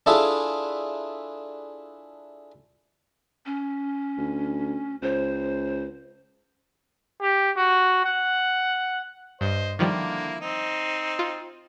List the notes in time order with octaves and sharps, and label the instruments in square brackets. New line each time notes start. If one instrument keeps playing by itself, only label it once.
[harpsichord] D4 E4 F4 G#4 A4 E5
[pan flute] C#4
[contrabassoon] D2
[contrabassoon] C#2 [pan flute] C5
[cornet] G4
F#4
F#5
[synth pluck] G2 [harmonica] C5 D#5
[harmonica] D3 A#3 E4 [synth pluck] D#3 F3 G3
[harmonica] C4 D#4
[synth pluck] F4